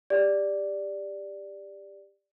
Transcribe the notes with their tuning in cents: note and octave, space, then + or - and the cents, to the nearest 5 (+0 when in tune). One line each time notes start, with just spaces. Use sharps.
G4 +25 D5 +0